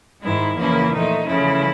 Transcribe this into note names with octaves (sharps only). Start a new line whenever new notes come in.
G#2 D#3 G#3 E4
E2 C#3 F3 A#3 E4
A#2 F3 A3 D#4
E2 C#3 F3 A3 E4